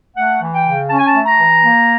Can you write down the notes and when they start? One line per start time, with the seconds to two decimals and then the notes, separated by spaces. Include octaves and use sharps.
0.16 A3 F#5
0.42 E3
0.53 G5
0.65 C#3
0.89 C#4 A5
0.98 G#5
1.06 A5
1.13 A3
1.26 A#5
1.37 E3
1.62 A#3